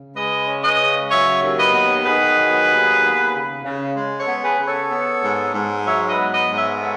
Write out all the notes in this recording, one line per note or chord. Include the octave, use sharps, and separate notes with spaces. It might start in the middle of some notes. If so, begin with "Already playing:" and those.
Already playing: C#3
G#3 B4 D#5
C#4
B4 D#5
C#3
F#3 C#5 E5
D#2
B4 D#5
B3
D#3 G#4 B4
F#3
D#2
B3
C#3
C#3
G#3
A4 C#5
B3
G#4 B4
C#3
A4 C#5
B3
G#2
G#2
F#3 C#5 E5
B4 D#5
B3
B4 D#5
G#2
C#5 E5
B3 A4 C#5